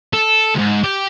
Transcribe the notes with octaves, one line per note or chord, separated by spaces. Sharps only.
A4
C#2 G#2
G4